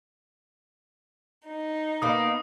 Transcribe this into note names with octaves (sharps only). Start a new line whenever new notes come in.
D#4
A#3 B3 D#6